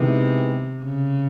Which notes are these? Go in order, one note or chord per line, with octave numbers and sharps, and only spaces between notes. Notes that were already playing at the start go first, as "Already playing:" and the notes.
Already playing: C3 D#3 G#3 B3 E4
C#3